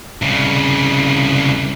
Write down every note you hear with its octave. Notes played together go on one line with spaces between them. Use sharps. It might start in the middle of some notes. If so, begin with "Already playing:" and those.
C2 C#3